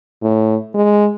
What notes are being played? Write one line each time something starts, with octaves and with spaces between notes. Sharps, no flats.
A2
G#3